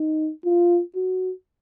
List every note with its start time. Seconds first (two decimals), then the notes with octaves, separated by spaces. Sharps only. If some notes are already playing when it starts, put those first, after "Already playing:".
Already playing: D#4
0.45 F4
0.96 F#4